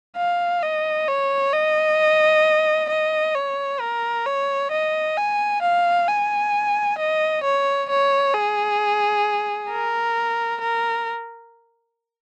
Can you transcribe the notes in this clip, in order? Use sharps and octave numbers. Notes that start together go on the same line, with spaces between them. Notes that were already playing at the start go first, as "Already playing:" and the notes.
F5
D#5
C#5
D#5
D#5
C#5
A#4
C#5
D#5
G#5
F5
G#5
D#5
C#5
C#5
G#4
A#4
A#4